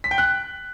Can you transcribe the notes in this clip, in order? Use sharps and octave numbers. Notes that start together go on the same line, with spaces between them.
B6
G5
F#6